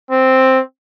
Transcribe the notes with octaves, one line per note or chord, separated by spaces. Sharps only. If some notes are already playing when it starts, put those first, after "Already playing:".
C4